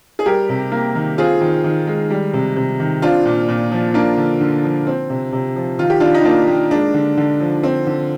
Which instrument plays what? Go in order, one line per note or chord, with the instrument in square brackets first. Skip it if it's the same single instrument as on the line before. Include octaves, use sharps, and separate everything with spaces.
[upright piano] G#4
G3 G4 A#4
C3
A#3
D#3
C4 F4 G#4
D#3
D#3
G#3
G3
C3
C3
D#3
C4 D4 F4
A#2
A#2
F3
A#3 D4 F4
D3
D3
F3
C4
C3
C3
F3
D#3 F4
G4
D#3 D4 F4
D#4
A#3 D4 F4
A#3
G#3 D4
D3
D3
F3
C4
D3